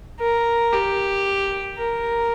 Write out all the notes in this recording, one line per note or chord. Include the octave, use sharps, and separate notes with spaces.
A#4
G4
A#4